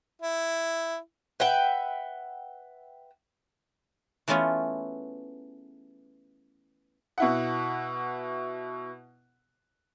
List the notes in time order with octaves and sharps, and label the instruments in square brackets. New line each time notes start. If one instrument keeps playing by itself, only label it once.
[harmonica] E4
[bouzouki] B4 E5 F#5 G5
[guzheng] E3 A3 B3 C#4 F4 G#4
[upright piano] B2 E4 F#5